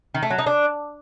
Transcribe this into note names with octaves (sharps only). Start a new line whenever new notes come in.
D#3
A3
F#3
D#4
D4